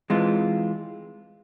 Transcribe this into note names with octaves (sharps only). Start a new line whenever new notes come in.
E3 G#3 C4 F4